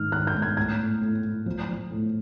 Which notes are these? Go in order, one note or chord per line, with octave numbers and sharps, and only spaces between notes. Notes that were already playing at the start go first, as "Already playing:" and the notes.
Already playing: G#2 D#3 F6
D#3 F#6
G6
G#2
G#6
A2 G#6
A2
A2
A2
F3
F3
A2